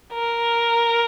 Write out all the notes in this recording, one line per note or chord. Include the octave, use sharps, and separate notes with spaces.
A#4